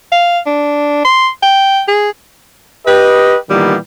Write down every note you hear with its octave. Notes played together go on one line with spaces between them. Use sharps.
F5
D4
C6
G5
G#4
G4 B4 D#5
A#2 D#3 E3 G3 A#3 B3